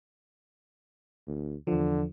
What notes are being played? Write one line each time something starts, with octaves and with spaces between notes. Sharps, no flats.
D2
E2 D3 F3